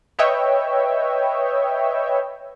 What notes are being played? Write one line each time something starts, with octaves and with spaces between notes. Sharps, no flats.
B4 C#5 D#5 E5 G5